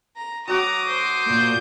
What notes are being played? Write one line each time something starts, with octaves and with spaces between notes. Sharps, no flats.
A#5
F#3 F#4 A#5 D6 D#6
C5
A#2 G6